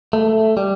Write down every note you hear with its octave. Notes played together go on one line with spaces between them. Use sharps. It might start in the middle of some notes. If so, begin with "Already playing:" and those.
A3
G3